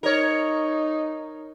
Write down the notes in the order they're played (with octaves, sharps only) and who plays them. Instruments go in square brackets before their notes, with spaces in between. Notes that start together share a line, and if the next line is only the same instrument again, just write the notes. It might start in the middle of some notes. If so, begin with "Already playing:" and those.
[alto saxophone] D#4 [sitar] A#4 C#5